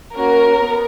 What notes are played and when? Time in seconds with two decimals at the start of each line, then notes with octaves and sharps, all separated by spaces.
0.13 A#3 C#4 F#4 A#4
0.56 B3